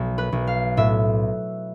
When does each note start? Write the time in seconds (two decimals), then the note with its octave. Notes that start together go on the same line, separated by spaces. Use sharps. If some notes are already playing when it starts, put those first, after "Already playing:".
Already playing: B1
0.18 B4
0.32 B1
0.47 F5
0.77 A2 E5